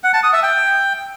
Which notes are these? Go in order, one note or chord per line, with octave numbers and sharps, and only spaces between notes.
F#5
A5
D#6
E5
G5